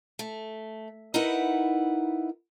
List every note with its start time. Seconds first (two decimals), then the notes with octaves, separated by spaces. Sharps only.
0.19 A3
1.14 D#4 E4 A#4 B4 E5 F#5